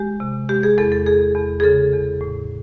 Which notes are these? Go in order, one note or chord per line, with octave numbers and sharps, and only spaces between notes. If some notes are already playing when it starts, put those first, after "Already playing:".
Already playing: G#3 G4
C3
G#3 G4
G#4
E2 A4
A4
E2 G#4
E2
G#4
C#3 A4
E2
A2